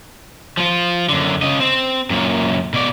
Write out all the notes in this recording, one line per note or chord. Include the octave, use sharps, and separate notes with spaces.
F3 F4
F#2 D3
C#3 D#5
C4
F#2 A#2
B2 D5